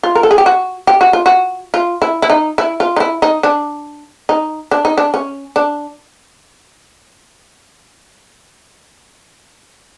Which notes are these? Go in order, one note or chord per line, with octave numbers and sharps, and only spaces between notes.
F4
A#4
A4
G#4
G4
F#4
G4
F#4
F4
F#4
F4
E4
E4
D#4
E4
F4
D#4
E4
D#4
D4
D#4
D4
D#4
D4
C#4
D4